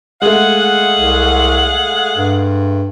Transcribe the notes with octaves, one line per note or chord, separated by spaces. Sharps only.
G#3 A3 G#4 F5 F#5
C2
G2